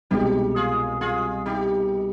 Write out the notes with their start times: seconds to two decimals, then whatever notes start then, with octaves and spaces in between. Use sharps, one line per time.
0.11 C2 B2 G#3 D#4 G4
0.56 F4 G#4
1.01 F4 G#4
1.46 D#4 G4